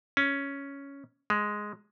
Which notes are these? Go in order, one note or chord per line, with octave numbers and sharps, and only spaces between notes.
C#4
G#3